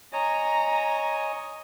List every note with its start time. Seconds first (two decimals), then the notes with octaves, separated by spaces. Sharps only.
0.13 C#5 D#5 G#5 A#5